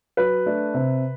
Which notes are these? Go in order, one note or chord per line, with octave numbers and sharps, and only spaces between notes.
F#3 B4
A3 D4
C3